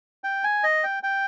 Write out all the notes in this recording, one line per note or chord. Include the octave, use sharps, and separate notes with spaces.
G5
G#5
D#5
G5
G5